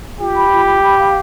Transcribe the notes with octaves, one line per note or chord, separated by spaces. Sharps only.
F4 G4
B5
F4
B5
B5
F5